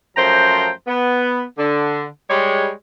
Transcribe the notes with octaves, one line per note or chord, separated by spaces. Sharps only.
F#2 F3 A3 C5 G5 A#5
B3
D3
G3 G#3 C#5